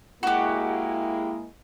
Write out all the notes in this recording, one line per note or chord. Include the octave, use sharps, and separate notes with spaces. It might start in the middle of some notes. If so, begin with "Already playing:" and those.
G#3 A#3 E4 F#4 G4